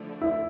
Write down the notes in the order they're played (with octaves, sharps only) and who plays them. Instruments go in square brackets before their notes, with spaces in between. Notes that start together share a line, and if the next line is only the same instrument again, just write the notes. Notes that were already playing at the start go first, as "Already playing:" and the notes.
Already playing: [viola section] D3 F3 A3
[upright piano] E4